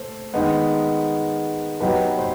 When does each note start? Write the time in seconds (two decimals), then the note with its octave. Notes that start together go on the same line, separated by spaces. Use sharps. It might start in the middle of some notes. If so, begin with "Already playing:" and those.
Already playing: A3 C5
0.34 D#3 G#3 B3
1.81 F#3 B3 D#4 G4 B4
2.18 C5